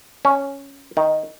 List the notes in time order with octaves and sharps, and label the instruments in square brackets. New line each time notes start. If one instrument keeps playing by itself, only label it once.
[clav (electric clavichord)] C#4
D#3